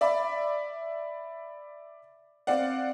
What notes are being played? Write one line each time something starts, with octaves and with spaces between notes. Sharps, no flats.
D5 E5 B5
C4 D5 F5 F#5